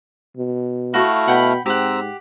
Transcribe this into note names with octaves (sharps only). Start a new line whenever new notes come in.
B2
A3 E4 F#4 F5 C#6
B2 F#5 G5 B5
G#2 C4 G4 F#5 A#5 E6